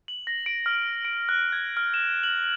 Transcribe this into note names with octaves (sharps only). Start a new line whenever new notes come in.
F#7
A#6
D7
F6
D7
F#6
G#6
F6
E7
F#7